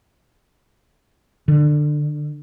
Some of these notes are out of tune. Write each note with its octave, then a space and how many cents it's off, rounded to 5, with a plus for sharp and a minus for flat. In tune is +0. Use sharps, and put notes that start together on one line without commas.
D3 +20